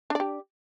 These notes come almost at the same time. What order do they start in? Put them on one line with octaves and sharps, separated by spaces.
D4 D5 G4